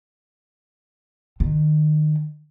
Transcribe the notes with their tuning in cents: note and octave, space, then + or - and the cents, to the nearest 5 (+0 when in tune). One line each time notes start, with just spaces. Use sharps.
D#3 -30